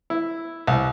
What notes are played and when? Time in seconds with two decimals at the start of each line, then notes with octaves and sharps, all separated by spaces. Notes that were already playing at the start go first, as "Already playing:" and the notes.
0.10 E4
0.67 C2